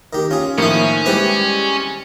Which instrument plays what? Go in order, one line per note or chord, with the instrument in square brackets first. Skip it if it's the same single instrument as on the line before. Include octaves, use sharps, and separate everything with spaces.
[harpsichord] D#3 G4
[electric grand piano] C#4 [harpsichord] F4 G#4
[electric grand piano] A2 F3 A#3 [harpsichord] D#3 E4 [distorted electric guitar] C#4
[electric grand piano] G3 G#3 E4 [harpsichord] G4 B4 C5